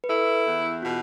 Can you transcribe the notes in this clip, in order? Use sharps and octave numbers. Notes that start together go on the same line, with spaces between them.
B4
E4 A4
E2
B2 F4